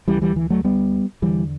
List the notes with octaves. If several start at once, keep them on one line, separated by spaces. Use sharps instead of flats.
D2 C#3 E3 G3
E3 G3
E3
F#3 A3
G3 B3
E2 D3 E3 G3